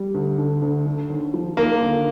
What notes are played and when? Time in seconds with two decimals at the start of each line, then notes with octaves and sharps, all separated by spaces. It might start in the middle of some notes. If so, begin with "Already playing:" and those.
Already playing: G3
0.14 D2
0.38 D3
0.62 D2
0.86 D3
1.10 D#2
1.34 F3
1.57 D#2 A#3
1.81 D3